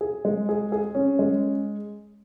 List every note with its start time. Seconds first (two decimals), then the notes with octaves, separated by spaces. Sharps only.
0.01 G#4
0.25 G#3
0.49 G#4
0.72 G#4
0.95 C#4
1.19 G#3